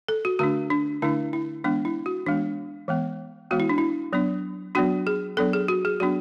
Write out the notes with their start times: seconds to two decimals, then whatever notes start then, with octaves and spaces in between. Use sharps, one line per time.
0.08 A4
0.25 F#4
0.39 D3 A3 D4 F#4
0.70 D4
1.02 D3 A3 D4 E4
1.33 E4
1.64 E3 G#3 B3 D4
1.85 E4
2.06 F#4
2.26 E3 G#3 B3 D4
2.88 E3 G#3 B3
3.51 E3 G#3 B3 F#4
3.60 E4
3.69 D4
3.78 E4
4.13 F#3 B3 D4
4.75 F#3 B3 D4 F#4
5.07 G#4
5.37 F#3 B3 D4 A4
5.53 G#4
5.68 F#4
5.85 G#4
6.00 F#3 B3 D4 F#4